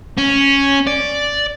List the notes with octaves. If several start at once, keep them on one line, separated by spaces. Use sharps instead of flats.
C#4
D5